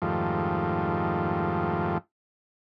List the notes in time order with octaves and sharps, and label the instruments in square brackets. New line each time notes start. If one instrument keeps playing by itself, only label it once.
[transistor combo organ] F2 G#2 D#3 F3 G3 A3